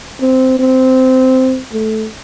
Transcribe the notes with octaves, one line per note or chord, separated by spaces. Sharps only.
C4
C4
A3